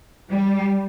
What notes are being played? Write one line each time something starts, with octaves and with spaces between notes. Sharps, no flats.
G3